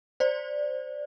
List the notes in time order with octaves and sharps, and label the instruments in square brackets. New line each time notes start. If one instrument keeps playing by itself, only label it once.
[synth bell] C5 D5